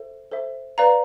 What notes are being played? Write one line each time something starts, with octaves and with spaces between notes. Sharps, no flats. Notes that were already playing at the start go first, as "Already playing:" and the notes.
Already playing: A4 C5 E5
A4 C5 E5
B4 D5 F5 A#5